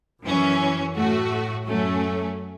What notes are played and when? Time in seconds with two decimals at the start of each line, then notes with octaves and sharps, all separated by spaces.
0.24 F#2 E3 C#4
0.95 A2 A3 F#4
1.67 F#2 F#3 A3 C#4